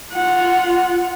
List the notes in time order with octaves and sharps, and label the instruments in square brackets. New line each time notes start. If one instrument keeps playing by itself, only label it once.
[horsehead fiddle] F4 F#5